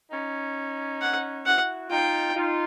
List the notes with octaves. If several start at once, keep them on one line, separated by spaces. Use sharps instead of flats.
C#4 D#4
F#5
E4 F#4 F#5
D#4 F4 G5
D#4 F4